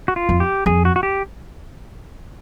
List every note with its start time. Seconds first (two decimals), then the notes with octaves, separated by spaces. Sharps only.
0.08 F#4
0.16 F4
0.29 F2
0.40 G4
0.66 F2 G#4
0.85 F#4
0.96 F#4
1.03 G4